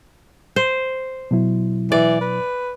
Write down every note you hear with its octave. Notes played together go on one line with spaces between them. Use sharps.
C5
B2 F#3 E4
E3 D5
B4